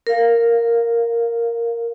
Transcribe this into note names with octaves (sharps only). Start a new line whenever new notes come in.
A#4 F5